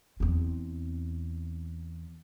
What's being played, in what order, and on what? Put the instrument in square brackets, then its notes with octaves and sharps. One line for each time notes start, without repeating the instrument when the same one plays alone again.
[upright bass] E2 C4